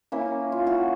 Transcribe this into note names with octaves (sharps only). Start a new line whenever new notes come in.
A#3 C#4 E4
F4
E4 F#4